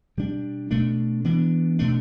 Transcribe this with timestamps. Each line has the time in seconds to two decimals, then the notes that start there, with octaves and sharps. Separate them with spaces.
0.17 B2 G3 D4
0.71 B2 A3 D4
1.25 E3 B3 D4
1.79 B2 A3 D4